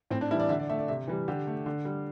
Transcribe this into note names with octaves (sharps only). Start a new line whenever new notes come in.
A2 C4
D4
E3 G3 E4
D5
D3 E5
D5
A3 E5
D5
C3 E5
E3 G3
D3 G4
A3
D3
G3